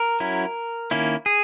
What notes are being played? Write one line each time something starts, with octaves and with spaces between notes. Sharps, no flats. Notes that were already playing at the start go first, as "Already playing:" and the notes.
Already playing: A#4
F#3 C#4 E4
D#3 A#3 C#4 E4
G#4